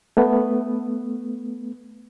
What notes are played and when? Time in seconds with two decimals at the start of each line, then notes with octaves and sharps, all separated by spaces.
0.17 A3 B3